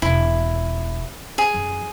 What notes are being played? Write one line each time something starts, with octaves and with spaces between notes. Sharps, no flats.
E1 E4
G#4
F#2